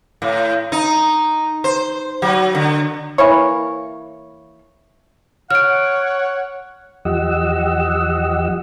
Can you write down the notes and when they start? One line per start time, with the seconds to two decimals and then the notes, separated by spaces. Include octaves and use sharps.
0.22 A2
0.72 D#4
1.64 C5
2.22 F#3
2.55 D3
3.18 E3 A#3 C#5
5.51 C#5 F#5 F6 D7
7.05 E2 F3 G4 D#5 F#5 E6